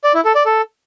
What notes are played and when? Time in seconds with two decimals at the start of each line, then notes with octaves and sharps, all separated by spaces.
0.04 D5
0.14 E4
0.25 A4
0.35 D5
0.46 A4